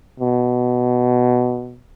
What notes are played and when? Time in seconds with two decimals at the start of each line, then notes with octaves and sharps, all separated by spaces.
0.20 B2